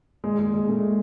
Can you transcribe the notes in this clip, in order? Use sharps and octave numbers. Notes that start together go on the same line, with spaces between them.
A#2 G#3
G#3
G#3
A#2 A3